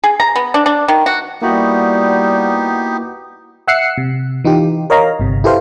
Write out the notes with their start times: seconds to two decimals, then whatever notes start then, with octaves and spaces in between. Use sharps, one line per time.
0.04 G#4
0.20 A#5
0.35 B3
0.54 D4
0.66 D4
0.88 D#3
1.06 F#4
1.42 G3 A#3 B3 D#4 E4 F#4 G4
3.67 E5 F#5 E6 F#6 C7 C#7
3.98 C3
4.44 E3 D#4 F4 G4
4.90 A#4 C#5 D#5 F5 A#5
5.20 G1 C3
5.44 E4 G4 A4 B4 C5 F5